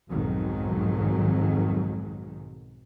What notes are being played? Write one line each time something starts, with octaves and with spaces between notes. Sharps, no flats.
B1 F2 G#2 D#3 F#3 G#3